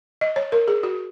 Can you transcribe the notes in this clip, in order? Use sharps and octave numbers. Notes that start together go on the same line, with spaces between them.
D#5
C#5
A#4
G#4
F#4